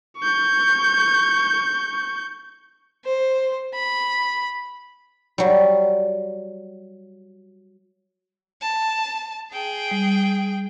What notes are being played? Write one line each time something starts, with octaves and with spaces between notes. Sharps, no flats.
C#6 G6
C5
B5
F#3 G3
A5
G#4 G5
G3